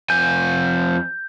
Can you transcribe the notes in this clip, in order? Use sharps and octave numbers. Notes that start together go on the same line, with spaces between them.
F2 G#5 G6